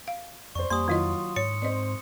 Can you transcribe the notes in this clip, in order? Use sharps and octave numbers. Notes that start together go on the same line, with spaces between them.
F5
F2 C5 D5 C#6
F2 G3 A#3 C5 G#5 C6 D#6
D#3 F#3 E4 F4 D#5
G#2 C#5 C#7
C4 C5 D5 D#5